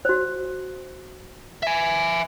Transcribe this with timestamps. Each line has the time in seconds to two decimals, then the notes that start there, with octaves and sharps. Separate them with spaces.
0.05 F#4 C5
1.63 E5 G#5